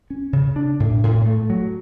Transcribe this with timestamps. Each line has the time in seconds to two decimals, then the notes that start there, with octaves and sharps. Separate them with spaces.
0.10 C#4
0.33 C#3
0.56 D4
0.80 A2
1.03 A2
1.26 A3
1.50 F#3